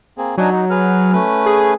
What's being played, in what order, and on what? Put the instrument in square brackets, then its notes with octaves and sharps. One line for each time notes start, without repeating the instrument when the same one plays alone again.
[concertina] A#3 C4 G#4
[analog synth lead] F#3 [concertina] D4 D#4 G#5
[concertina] D#4
G#4 B4 F6
A3 C#4 B4
[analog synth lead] G#4